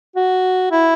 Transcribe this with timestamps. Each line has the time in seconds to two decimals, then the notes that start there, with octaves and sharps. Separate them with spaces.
0.16 F#4
0.72 E4